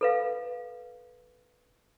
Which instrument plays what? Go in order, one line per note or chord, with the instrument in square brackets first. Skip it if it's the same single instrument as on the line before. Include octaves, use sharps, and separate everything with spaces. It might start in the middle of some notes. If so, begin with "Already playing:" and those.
[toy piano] A4 B4 F5